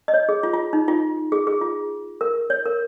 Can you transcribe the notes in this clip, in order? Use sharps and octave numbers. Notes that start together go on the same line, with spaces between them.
D#5
C#5
G#4
F4
F4
D#4
F4
G#4
G#4
F4
A#4
C#5
A#4